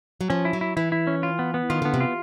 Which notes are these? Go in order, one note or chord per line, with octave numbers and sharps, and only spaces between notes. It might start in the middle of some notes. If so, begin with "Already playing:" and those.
F#3
F3 C#4
E4
F#3
E4
E3 E4
E4
C#4
F4
B3
B3
D#3 F4
D3 B3
C3
F4